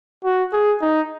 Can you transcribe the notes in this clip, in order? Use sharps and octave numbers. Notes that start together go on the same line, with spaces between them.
F#4
G#4
D#4